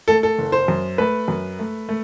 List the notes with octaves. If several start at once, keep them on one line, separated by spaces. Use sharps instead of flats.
A3 A4
A4
F#1
C5
F#2
A3 B4
F#2
A3
A3